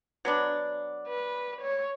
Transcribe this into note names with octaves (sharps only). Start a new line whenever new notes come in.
F#3 B3 D4
B4
C#5